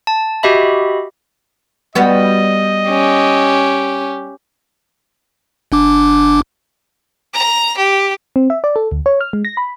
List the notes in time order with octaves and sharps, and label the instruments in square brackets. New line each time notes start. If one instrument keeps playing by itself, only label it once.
[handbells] A5
F#4 G4 D#5 E5 B5
[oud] G3 B3 F#4 [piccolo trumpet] D#5
[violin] C#4 G4
[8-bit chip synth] G1 D4 D6
[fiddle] A#5
G4
[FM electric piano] C4
E5
D5
A4
D2
C#5
F6
G#3
A#6
B5